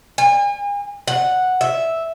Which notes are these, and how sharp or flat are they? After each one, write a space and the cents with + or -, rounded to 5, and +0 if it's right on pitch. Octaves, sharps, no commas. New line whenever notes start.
G#5 -40
F#5 -5
E5 -5